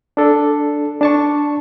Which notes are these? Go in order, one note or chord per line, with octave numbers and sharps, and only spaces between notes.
D4 A4
D4 A5 C#6